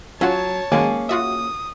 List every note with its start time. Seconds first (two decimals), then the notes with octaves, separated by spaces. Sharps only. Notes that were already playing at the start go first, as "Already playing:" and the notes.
0.21 F#3 C#4 F4 C#5 F#5 A5
0.72 D#3 F#3 G#3 A#3 C#4 G#4
1.09 F4 F#4 E5 D#6